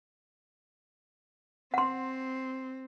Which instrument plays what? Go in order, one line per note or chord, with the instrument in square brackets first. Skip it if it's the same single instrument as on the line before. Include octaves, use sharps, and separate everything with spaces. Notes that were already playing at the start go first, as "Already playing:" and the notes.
[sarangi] C4 [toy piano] F#5 C6